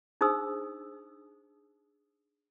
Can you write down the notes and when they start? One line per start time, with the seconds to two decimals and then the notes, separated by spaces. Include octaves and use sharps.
0.21 D4 D#4 G#4 C5 D#6 E6